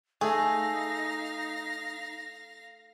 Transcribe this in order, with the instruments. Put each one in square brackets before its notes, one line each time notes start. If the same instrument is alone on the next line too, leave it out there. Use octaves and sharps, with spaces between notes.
[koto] A3 [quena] D#4 [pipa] G#4 [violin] F5 A#6